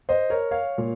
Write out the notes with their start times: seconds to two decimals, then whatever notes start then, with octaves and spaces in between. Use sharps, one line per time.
0.09 C5 D#5
0.30 A#4 C#5
0.51 C#5 F5
0.78 A#2